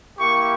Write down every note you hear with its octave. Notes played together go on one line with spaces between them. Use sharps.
A#3 E4 G4 C#6